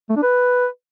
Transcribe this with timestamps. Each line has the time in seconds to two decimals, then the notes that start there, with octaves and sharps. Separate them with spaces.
0.10 A3
0.16 D4
0.23 B4